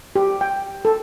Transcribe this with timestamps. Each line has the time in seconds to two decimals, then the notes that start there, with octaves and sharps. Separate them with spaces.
0.16 G4
0.41 G5
0.85 A4